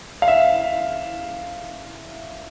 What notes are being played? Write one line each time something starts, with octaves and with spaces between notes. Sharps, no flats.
F5
E5